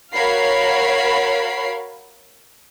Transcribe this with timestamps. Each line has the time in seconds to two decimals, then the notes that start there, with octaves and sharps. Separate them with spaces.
0.14 F#4 A#4 C#5 F5 B5 C7